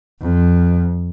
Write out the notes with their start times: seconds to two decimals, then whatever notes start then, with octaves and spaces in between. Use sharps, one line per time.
0.21 F2